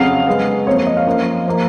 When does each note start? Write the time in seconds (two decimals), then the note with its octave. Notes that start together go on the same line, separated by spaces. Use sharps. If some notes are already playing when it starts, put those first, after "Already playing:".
Already playing: F2 C#3 F#3 F5
0.27 C#3 G#3 B3
0.67 F2 F3 A#3 C#5
0.77 C#5
0.87 D#5
0.97 F5
1.07 F#2 F3 A#3
1.48 F3 A#3